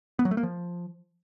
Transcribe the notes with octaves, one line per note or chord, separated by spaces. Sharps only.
B3
F#3
A3
A#3
F3